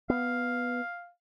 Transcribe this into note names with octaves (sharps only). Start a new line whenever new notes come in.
B3 F5